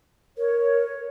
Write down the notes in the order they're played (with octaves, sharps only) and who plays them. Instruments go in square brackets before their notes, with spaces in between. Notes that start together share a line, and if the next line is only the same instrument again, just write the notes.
[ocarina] A#4 [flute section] C#5